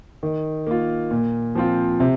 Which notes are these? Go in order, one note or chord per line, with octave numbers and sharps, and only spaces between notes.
D#3
A#3 F4
A#2
F3 C4 F4
C3